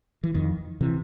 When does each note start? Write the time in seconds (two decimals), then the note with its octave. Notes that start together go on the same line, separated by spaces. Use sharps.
0.24 E3
0.35 F2 D#3
0.81 C3 E3